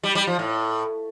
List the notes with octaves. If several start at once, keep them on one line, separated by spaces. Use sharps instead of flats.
G3
G3
F3
A2